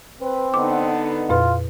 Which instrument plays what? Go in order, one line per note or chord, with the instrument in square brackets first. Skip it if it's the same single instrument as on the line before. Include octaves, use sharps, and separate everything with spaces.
[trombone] C4 [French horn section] B4
[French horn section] D3 B3 D#4 [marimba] D6
[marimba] F2 A#2 B4 [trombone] F4